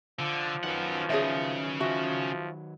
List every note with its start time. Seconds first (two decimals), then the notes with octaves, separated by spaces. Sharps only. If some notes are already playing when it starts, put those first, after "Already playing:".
0.19 D3 F3
0.64 D#3 F#3 C#4 B4 F#5
1.10 C#3 G#4 C#5 E5
1.80 F3 F#4 E5